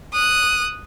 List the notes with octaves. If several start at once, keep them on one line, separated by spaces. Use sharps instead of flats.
D#6 F#6